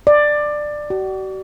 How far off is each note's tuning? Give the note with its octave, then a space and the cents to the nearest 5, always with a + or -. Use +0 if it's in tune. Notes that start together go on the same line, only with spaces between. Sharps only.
D5 +15
F#4 +45